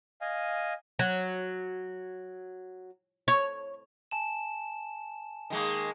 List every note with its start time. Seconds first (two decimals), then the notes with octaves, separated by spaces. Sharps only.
0.21 D#5 F5 G#5
0.99 F#3
3.28 C#5
4.11 G#5 A5 E7
5.50 D#3 G#3 A#3